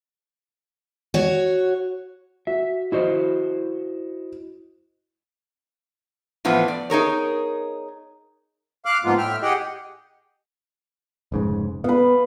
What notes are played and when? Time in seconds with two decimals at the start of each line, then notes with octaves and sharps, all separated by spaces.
1.14 F#4 C#5
2.47 F#4 E5
2.92 E4 F#4 C5 D#5
6.45 A2 E3 F3 B3
6.68 D5
6.90 D#4 G#4 A#4 C#5
8.85 F5 D6 F6 F#6
9.04 G#2 F3 G#3 A#3 B3 F4
9.18 A2 E5 G5 F6
9.42 G4 G#4 D#5 F#5 G5
11.32 F1 G#2 C#3
11.84 B3 B4 F5